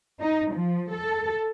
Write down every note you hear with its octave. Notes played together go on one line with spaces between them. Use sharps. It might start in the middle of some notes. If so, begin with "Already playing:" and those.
D#4
F3
A4